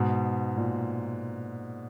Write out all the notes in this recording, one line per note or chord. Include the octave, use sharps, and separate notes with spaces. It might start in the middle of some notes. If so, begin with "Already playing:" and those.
Already playing: G#2 B2
A#2